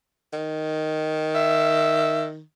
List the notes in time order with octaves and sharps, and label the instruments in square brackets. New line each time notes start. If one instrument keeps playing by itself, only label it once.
[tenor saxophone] D#3
[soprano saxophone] E5